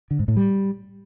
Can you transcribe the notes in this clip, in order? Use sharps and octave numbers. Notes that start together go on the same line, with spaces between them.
D3
G#2
A2
G3